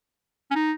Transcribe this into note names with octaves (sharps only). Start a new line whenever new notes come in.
C#4
D#4